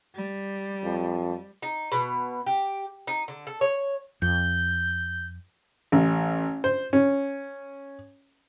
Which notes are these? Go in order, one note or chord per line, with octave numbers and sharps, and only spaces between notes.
G3
F2
D#4
B2
G4
D#4
D3
A4
C#5
F2 G6
A1
C5
C#4